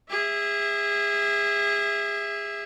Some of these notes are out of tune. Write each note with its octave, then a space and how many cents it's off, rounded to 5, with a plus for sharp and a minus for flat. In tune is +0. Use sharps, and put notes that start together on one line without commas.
G#4 -30 E5 +0